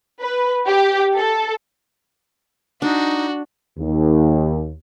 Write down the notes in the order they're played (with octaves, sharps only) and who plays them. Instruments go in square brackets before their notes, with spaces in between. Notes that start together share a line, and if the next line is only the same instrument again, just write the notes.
[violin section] B4
G4
A4
[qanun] D4 [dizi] D#4 [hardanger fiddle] F#4
[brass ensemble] D#2